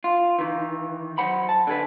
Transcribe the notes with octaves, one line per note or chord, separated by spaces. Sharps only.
F4
D#3 E3
F#3 C5 F#5 B5
A5
D3 G#4 B4